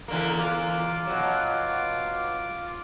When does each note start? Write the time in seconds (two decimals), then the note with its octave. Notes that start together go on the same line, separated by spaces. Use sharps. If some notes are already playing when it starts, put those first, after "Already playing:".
0.08 E2 D3 A#3
0.38 F4 D6
1.07 B2 F#3